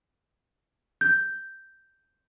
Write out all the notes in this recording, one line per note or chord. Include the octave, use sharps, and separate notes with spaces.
G6